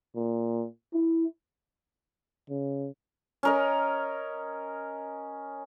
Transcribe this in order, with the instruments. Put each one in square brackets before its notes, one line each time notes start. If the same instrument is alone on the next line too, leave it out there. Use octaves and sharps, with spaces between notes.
[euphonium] A#2
E4
C#3
[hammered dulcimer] C#4 A#4 D#5